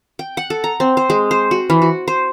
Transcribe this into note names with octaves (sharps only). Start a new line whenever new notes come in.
G5
F#5
A4
A#5
C4
C5
G#3
C5
F#4
E3
F#4
C5